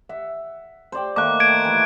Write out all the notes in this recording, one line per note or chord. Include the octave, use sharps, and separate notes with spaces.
E5 F#5
C5 D5 G5
D#3 A3 A#3 D6 F#6
G#6 D7
E3 A3